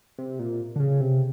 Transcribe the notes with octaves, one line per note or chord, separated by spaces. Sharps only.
C3
A#2
D3
C#3
C3